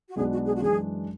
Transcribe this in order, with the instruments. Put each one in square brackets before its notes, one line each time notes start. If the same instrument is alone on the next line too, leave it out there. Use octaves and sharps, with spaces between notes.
[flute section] F#4
[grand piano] B1 B2 G#3 B3 D4 [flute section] G#4
[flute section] F#4
G#4
F#4
[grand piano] F#2 E3 G#3 D4 [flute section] G#4